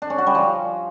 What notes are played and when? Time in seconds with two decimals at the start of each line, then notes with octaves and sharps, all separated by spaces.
0.02 D4
0.10 C#4
0.18 F#4
0.27 G3
0.35 F3